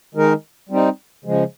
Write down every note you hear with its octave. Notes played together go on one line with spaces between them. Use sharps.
D#3 G#3 D#4 A#4
G3 C4 D#4
C#3 F3 G#3